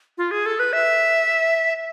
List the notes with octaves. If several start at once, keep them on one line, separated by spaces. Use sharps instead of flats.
F4
G#4
A4
B4
E5